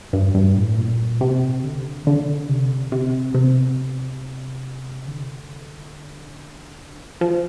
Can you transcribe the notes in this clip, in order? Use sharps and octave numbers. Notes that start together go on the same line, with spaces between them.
G2
G2
A2
A#2
C3
D3
D3
C3
C3
C3
D3
F3